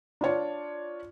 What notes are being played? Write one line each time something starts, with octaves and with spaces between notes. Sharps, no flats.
D4 F4 C#5 D5